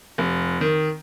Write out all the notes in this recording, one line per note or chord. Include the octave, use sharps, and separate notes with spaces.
F1
D#3